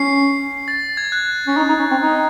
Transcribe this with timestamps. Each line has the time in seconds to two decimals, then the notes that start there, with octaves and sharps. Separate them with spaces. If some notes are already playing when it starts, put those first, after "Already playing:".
Already playing: C#4 C7
0.68 A6
0.97 G#6
1.12 F#6
1.47 C#4
1.57 D#4
1.68 D#4
1.79 C#4
1.91 C4
2.02 D#4